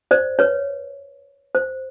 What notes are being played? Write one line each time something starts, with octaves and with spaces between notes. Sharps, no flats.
C5 D5
B4 C#5
C5